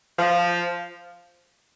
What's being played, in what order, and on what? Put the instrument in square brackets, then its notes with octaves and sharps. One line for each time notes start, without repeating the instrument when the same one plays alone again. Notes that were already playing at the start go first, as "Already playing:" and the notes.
[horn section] F3